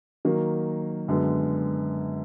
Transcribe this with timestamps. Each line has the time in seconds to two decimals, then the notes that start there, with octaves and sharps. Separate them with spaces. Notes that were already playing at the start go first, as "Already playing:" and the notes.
0.25 D#3 F#3 A#3
1.08 F#2 D3 G#3 B3